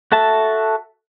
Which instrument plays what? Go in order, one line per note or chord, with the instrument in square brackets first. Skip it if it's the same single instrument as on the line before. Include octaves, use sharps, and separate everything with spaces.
[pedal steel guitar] F#4 A4 E5 A5